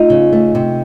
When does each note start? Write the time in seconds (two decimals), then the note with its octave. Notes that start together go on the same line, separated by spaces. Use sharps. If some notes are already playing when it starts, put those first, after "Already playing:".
Already playing: A3 D#4 F4
0.10 C#3
0.33 A3
0.55 C3